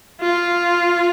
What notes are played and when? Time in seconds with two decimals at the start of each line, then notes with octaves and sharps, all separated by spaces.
0.21 F4